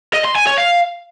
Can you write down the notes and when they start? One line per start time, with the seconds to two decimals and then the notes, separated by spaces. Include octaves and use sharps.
0.13 D#5
0.25 C6
0.36 G#5
0.47 C#5
0.58 F5